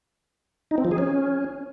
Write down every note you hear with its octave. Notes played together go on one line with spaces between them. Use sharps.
D#4
C4
F3
G#4
C#4